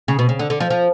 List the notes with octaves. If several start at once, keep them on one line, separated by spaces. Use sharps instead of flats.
C#3
B2
C#3
D3
D3
F3
F3